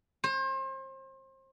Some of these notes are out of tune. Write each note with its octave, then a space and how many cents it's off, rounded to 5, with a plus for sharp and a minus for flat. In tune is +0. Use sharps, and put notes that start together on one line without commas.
C5 +35